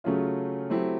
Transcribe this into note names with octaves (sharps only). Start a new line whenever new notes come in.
C#3 F#3 A3 C#4 F4
F#3 A3 C4 E4 G4